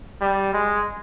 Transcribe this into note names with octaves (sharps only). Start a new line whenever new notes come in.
G3
G#3